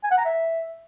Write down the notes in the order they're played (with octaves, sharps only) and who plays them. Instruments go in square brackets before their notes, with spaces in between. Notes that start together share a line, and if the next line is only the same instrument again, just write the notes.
[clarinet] G#5
F#5
A#5
E5